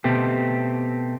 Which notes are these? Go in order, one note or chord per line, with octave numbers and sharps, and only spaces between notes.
B2 A3 C4 G4